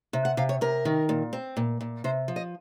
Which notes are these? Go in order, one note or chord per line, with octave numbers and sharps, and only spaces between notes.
C3
F#5
C3 F5
C#5
C3 A#4
D#3
A#2
C4
A#2
A#2
C3 C5
F3
D#5